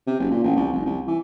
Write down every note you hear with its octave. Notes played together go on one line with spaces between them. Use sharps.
C3
F#1
A#2
A1
C2
F1
C2
E3